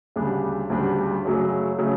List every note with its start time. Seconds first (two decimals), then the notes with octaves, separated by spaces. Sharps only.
0.16 D2 C#3 G3 D4
0.70 D2 C#3 G3 D4
1.24 F#2 C#3 F#3 A3
1.79 C#3 F#3 A3